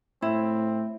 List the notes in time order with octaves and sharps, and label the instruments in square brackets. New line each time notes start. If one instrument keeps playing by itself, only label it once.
[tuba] A2 [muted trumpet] C4 [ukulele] E4